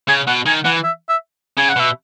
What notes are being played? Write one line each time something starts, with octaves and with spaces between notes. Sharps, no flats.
C#3 G#5
B2 F#5
D#3 G#5
E3 F#5
E5
E5
C#3 G#5
F#5
B2 E5